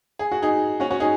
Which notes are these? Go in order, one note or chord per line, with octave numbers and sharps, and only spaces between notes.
G#4
F#4
D#4 G#4
C#4 F#4
C#4 F#4
D#4 G#4